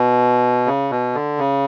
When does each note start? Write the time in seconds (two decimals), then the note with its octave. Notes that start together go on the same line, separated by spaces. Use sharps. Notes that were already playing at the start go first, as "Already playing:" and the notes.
Already playing: B2
0.66 C#3
0.91 B2
1.15 D3
1.38 C#3